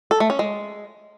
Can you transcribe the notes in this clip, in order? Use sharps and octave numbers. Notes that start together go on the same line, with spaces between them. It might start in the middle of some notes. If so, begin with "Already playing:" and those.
A4
A3
C#4
G#3